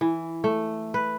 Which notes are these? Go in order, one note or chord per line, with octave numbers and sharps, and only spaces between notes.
E3
A3
B4